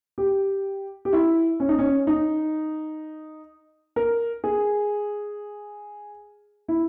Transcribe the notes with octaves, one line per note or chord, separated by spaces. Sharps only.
G4
G4
E4
C#4
D#4
C#4
D#4
A#4
G#4
E4